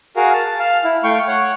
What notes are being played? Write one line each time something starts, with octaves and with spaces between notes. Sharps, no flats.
F#4 G#4 A#4 F5
A5
F5
E4
A3 F5 G5 C#6
C#5 F#5